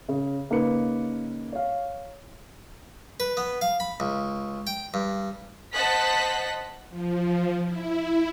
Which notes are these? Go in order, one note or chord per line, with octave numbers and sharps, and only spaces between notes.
C#3
C#3 A#3 D#4 B4 C#7
C#5 F5
B4
B3
F5
B5
C#2
G5
G2
C5 D#5 F#5 A5 F#6 B6
F3
E4